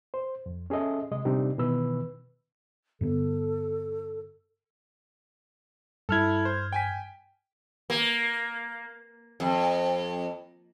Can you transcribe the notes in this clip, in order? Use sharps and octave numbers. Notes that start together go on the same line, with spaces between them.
C5
F2
C#4 G#4 A4 D#5 E5
C3 G#3 D#5
C3 G3 C4 D4 D#4 G4
B2 D#3 E3 B4 E6
G2 D3 B3 A4
G2 E4 A4 F6 G#6
C5
G5 G#5 B6
A#3
F2